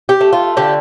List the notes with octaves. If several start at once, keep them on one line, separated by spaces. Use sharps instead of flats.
G4
A3
F4
D3 G4